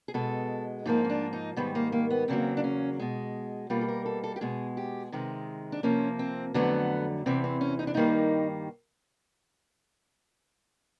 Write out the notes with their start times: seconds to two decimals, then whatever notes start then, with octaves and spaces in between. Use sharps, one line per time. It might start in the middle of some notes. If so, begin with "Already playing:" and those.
0.08 G#4
0.14 B2 G#3 A4
0.85 G#2 F3 A#3 D#4
1.05 C#4
1.10 D4
1.33 D#4
1.56 G#2 D#3 G3 B3
1.75 A#3
1.92 A#3
2.10 B3
2.28 E2 C#3 F#3 A#3 C4
2.57 D4
2.64 C#4
2.99 B2 G#3
3.70 B2 G3 A#3 F4
3.81 A4
3.88 A#4
4.06 A4
4.24 A4
4.36 G4
4.41 B2 G#3 G#4
4.77 G4
5.12 C3 D#3 G#3
5.72 D4
5.83 C3 F3 A#3 C#4
6.19 C4
6.54 F2 D3 F#3 A3 B3
7.26 E2 C3 E3 C4
7.44 C4
7.61 C#4
7.79 D#4
7.87 D4
7.95 G2 D#3 G3 A#3 D#4